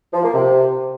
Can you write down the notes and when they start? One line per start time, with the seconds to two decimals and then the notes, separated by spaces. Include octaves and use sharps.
0.13 F3
0.23 A#3
0.34 C3